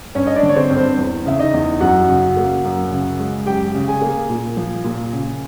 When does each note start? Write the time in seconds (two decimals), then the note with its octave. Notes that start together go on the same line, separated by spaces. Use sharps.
0.15 G2 C#4 C#5
0.27 D#5
0.36 D4 D5
0.43 D3
0.49 C#5
0.56 C4 C5
0.70 G2
0.77 C4 C5
0.98 E2
1.25 C#3 E5
1.39 D#4 D#5
1.54 E2
1.80 F#2 F#4 F#5
2.09 C#3
2.37 A#3
2.64 F#2
2.91 C#3
3.19 G#3
3.46 F#2 G4 G5
3.75 C#3
3.88 G#4 G#5
4.02 A#3
4.29 A#2
4.57 F3
4.84 A#2
5.13 C#3